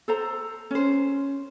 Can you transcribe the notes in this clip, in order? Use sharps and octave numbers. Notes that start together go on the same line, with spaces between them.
A4 C5 A#5
C#4 C5